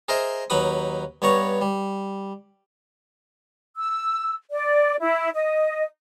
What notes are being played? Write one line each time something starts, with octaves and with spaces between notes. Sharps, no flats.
G#4 A#4 C5 D#5 E5
D#2 F#3 D#4 B4 B5 D#6
G2 B3 C#5 A#5 C#6
G3
E6
D5
E4
D#5